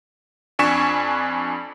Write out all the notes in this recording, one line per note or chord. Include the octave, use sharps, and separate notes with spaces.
F2 D4 G#5 C#6 B6 E7